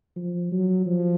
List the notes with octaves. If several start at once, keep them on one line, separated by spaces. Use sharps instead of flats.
F3
F#3
F3